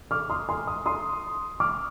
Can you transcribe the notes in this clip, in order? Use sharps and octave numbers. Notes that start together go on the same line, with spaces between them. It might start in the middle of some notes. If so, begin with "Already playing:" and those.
D6 F6
C6 D#6
G#5 C6
C6 D#6
C6 D#6
D6 F6